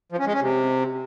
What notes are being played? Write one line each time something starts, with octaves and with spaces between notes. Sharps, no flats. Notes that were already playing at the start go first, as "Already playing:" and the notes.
F3
C#4
G#3
C#4
C3